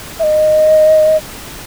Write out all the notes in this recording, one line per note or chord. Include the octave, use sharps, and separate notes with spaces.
E5
D#5